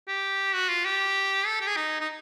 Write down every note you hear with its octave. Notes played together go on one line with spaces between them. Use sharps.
G4
F#4
F4
G4
A4
G4
G#4
D#4
D#4